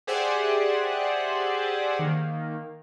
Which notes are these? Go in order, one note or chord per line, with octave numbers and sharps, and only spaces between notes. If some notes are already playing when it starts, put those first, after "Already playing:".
G4 G#4 C5 D5 E5 F#5
D#3 A#3